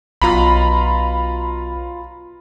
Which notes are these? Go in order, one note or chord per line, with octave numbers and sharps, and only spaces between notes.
B1 F4 A#5 B5